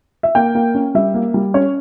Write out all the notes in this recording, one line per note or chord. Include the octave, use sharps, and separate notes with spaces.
E5
A#3 G5
A#3
C#4
G3 E5
A#3
G3
C#4 C#5